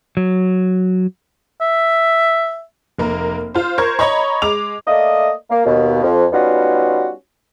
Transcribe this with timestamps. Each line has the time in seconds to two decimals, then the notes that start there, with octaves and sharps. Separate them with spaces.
0.17 F#3
1.61 E5
2.98 F1 A#3 A#4
3.55 F4 C5
3.78 A#4 C5 C#6 G#6
3.99 C#5 D#5 A#5 B5 C#6
4.42 G#3 D6 F7
4.87 A3 A#3 D5 D#5
5.50 A#3
5.65 D#2 B2
6.03 F2
6.32 G3 B3 C#4 D#4 F4 F#4